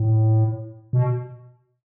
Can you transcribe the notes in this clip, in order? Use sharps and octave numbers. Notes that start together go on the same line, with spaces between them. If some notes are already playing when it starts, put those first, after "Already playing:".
Already playing: A2
B2